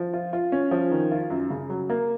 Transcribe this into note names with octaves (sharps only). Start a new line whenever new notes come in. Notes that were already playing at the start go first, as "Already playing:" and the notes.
Already playing: F3
F4
F4
C#4
F3
D#3
F4
F#2
C#3
F#3
A#3